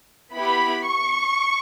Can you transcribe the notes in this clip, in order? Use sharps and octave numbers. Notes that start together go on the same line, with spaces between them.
B3 E4 G4 B5
C#6